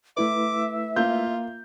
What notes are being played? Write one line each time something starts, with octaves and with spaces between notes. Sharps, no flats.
A3 E4 B4 E5 D6
A#3 F4 G6